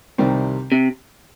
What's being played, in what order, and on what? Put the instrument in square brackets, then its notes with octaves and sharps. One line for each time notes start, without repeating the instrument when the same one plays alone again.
[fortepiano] C2 C3 D#3 G3 C4
[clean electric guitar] C3